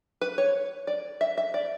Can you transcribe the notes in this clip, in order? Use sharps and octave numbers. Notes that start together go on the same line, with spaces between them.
B4
C#5
D5
E5
E5
D5